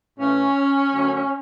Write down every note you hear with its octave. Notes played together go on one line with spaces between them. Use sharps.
A2 E3 A3 C#4
F#2 D3 F#3 A3